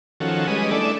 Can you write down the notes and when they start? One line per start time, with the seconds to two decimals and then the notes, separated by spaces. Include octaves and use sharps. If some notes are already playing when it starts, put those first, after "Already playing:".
0.20 D#3 F3 C#4 F#4 A4
0.47 G3 G#3 C#4 B4 D#5
0.71 A3 D4 E4 A4 D5